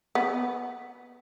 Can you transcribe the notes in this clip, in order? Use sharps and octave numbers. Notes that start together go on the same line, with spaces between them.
B3